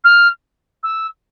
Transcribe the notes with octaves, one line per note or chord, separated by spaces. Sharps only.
F6
E6